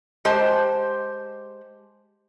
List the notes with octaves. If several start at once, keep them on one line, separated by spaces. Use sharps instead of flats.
G#3 G4 C5 A5